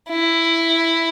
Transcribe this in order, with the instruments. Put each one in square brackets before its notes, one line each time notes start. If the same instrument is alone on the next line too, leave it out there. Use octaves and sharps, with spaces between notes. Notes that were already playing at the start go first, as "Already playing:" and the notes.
[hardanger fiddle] E4